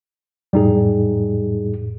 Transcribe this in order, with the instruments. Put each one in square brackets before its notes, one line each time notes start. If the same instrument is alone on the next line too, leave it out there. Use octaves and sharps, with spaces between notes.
[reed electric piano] F2 A2 [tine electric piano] G3 D#4 G#4